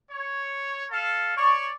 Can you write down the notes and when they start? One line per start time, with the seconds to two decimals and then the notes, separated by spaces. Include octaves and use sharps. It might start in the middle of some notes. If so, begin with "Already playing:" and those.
0.11 C#5
0.91 A4 F5
1.37 C#5 D5 C#6